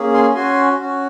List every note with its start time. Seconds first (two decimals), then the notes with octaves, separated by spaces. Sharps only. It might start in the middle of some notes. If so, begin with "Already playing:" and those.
Already playing: A#3 C#4 G#4
0.14 G#5 C6
0.35 C#4 F#4 G#5 C6
0.77 C#4 F#4